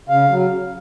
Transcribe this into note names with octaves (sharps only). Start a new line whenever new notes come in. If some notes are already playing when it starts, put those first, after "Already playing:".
C#3 F5
F#3